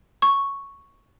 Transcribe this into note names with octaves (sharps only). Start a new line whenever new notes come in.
C#6